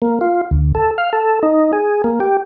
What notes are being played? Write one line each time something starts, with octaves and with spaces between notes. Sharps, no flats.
A#3
F4
D2
A4
F5
A4
D#4
G#4
A#3
G4